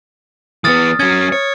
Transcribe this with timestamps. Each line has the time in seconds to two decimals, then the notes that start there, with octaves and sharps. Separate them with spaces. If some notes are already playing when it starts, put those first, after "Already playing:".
0.64 E3 B3 D#6 F6 A6
1.00 F#3 C#4 G#6
1.32 C#5